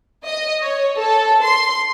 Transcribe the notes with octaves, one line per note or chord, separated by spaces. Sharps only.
D#5
C#5
A4
C6